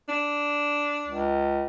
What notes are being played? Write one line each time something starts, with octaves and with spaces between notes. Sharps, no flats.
D4
C#2